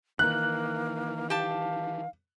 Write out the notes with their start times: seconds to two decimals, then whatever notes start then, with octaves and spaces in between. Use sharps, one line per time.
0.19 D#3 E3 A#3 F#6
1.30 G4 F5 A5